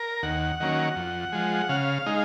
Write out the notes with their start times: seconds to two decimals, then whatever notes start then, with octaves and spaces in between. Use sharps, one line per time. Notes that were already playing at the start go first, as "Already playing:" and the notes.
Already playing: A#4
0.23 D#2 F#5
0.60 D#3 F#3 A#3 C#4
0.96 F2
1.32 F3 G#3
1.69 C#3 F5
2.06 G#3 D#4